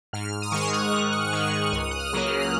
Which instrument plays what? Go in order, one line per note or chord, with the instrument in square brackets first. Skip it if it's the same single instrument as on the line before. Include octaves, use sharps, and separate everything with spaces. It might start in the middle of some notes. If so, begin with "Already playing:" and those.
[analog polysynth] G#2 F6
F6
D#6
D#3 G#3 C#6
F#6
G#2
F6
D#3 G#3 C#6
F6
C#2 D#6
F#6
F6
C#3 F#3 A#3 C#4
F#6
D#6